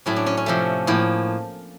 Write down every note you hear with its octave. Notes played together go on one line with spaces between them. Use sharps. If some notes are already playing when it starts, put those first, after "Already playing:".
A2 F#3 A3 C#4
D4
C#4
C#4
C3 F3 A3
A2 F3 A#3